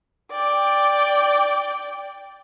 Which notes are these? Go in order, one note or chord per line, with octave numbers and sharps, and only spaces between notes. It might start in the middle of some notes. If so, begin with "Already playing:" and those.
D5 G5